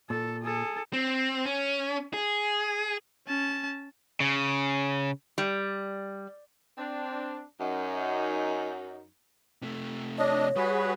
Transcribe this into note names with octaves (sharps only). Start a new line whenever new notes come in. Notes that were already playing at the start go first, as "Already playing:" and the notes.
A#2 A4
G#4 A4
C4
C#4
G#4
C#4 A5
C#3
G3
C4 D4
F#2 D#4
C3 A3
D4 C#5 D#5
G3 F#4 G#4 B4